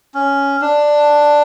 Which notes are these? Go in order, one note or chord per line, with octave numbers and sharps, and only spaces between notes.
C#4
D4